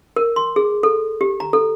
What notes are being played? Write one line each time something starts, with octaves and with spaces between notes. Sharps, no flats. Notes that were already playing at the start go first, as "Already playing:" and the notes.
A#4
C6
G#4
A4
G4
A#5
A4